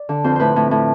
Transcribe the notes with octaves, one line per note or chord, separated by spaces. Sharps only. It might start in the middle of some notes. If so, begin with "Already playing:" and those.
Already playing: D5
D3
F2 C5
A2 B4 C5
A2
A2